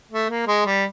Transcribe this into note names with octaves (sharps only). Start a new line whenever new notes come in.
A3
A#3
G#3
G3